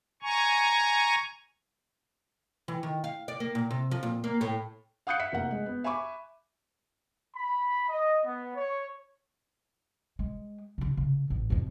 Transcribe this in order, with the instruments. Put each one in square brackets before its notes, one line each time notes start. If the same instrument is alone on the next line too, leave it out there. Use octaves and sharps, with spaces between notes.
[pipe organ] G#5 A#5 C#6
[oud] E3
D#3
F5
D5
A#3
A#2
C3
F3
A#2
A#3
A2
[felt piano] F5 F#5 D#6 F#6 G6 C#7
E5 B6 C#7
F1 A#3 F#5
G#3
B3
E5 G#5 B5 C#6 D6
[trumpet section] B5
D#5
B3
C#5
[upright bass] G#3
C#3 D4
C#3
A1
F2 F3